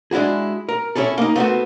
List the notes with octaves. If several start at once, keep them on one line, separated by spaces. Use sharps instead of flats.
G#3 D4 E4 F#4 G#4
A#4
C#4 E4 G#4 A4
A#3 D#4
A3 B3 C4 F#4